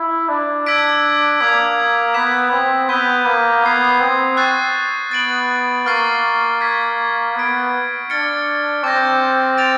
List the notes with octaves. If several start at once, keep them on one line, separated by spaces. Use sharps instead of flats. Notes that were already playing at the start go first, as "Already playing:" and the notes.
Already playing: E4
D4
E6 G#6 B6 D7
A#3 D#6 G#6 B6
B3 G#6 B6 E7
C4
B3 D#6 G6 B6 D#7 G7
A#3
B3 D#6 G#6 C7
C4
C#6 F#6 A6 C7
B3 A6 D7 F#7
A#3 C#6 F6 A6 C7
C#6 F6 G#6 B6
B3 G#6 B6 D7
D4 F6 A6 C#7
C4 D6 G6 A#6
A6 D7 F7